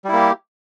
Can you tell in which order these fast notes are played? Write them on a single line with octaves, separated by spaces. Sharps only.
G3 E4 A#3 G4